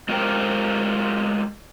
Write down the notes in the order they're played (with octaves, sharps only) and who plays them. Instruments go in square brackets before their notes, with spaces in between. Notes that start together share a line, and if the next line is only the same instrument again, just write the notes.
[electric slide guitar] G#3 F4 G4 A#4 C5 G5